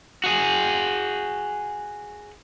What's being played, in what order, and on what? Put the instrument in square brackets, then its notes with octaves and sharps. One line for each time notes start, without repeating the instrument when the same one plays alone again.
[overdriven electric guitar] F#4 G#4